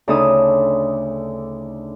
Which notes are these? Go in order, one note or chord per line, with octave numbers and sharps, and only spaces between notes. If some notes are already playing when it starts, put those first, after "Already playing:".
D2 C#3 D4 D#4 A4 D#6